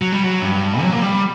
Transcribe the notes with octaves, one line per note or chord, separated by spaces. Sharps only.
F#3
G3
F#3
G2
F#3
A#3
G3